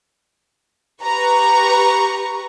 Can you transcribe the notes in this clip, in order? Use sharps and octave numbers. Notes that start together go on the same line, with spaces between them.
G4 B4 A#5 C#6